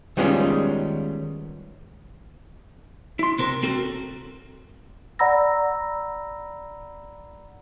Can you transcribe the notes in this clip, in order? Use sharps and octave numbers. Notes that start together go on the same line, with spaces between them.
D#3 G3 G#3 B3 C#4 F4
E4 C6
C3 C4 A#4
C4 F#4 A4 A#4
D5 F#5 A#5 B5 E6 A#6